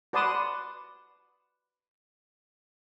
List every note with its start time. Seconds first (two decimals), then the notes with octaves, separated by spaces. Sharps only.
0.13 F#4 B4 D5 A5 C6 D#6